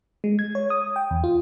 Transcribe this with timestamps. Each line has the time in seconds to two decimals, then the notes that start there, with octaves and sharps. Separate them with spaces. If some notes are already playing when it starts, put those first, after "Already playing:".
0.24 G#3
0.39 G#6
0.55 C#5
0.70 D#6
0.96 G5
1.11 E2
1.24 F4